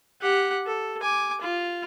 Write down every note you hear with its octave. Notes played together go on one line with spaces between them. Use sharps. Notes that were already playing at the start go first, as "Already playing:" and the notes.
G4 F#5
A4
G#5 D6
F4